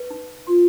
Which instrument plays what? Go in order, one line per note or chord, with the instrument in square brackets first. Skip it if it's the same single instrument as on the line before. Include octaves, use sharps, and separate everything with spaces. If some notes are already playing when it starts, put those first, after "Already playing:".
Already playing: [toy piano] B4
D#4
[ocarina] F4 [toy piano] C6